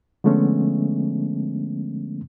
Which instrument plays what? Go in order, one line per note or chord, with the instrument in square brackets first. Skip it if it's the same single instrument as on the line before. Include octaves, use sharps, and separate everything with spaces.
[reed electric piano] D3 F3 G#3 A3 B3 C#4